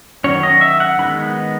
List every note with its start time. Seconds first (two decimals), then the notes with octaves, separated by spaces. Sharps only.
0.24 D#3 F#3 C#4 C#5
0.43 D#5
0.61 E5
0.80 F#5
0.99 D#3 G#3 B3 D#4 B5